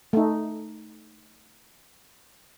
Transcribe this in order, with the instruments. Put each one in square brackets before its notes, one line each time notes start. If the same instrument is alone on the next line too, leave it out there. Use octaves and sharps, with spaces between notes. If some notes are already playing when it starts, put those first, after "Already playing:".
[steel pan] A3 D#4